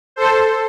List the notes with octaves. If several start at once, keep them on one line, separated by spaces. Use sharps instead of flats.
A4 C5